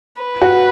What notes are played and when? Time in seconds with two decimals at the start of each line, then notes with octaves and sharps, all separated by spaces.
0.22 B4
0.42 F#4